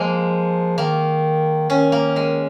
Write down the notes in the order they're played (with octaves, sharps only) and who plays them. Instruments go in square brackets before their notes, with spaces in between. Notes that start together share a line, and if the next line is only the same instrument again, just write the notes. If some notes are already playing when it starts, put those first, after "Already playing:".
Already playing: [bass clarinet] F3 [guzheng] G#3 A#3
[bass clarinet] D#3 [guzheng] A#3
[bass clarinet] D#3 [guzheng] C#4
[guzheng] A#3
G#3